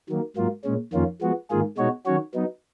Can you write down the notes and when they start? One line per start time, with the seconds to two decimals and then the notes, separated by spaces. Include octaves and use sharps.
0.09 D#3 F#3 A#3
0.37 G#2 F#3 A#3 F4
0.64 A#2 G#3 C#4
0.93 F2 D#3 A#3 C#4 F4
1.21 F3 G#3 B3 F#4
1.50 G#2 D#3 A#3 F4 G#4
1.77 B2 G#3 D#4 F#4 C#5
2.06 D#3 F#3 C#4 F#4 C#5
2.34 F#3 B3 D#4